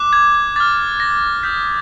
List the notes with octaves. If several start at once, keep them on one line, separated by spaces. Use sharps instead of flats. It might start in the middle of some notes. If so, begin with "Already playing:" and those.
Already playing: D6 F#6
G#6
G#6
D6 F6 A6
A#6
D#6 G6 B6